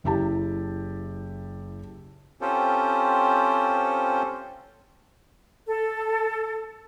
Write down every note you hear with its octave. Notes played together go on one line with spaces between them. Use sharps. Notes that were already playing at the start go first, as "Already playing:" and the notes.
F#1 E4 G4 A5
C4 C#4 F4 G4 A4 C5
A4